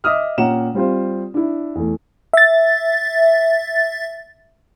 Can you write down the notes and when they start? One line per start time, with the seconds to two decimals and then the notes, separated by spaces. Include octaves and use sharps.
0.04 D#5 E5 D6 D#6 F6
0.38 A#2 C#4 F#5 G5 A#5 E7
0.75 G3 C4 F4 C5
1.34 D4 E4
1.75 E2 A3
2.33 E5 A6